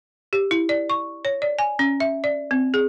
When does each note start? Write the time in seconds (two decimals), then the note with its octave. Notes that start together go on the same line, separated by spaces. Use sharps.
0.33 G4
0.51 E4
0.69 D5
0.90 C#6
1.25 C#5
1.42 D5
1.59 G#5
1.79 C#4
2.00 E5
2.24 D5
2.51 C4
2.74 G#4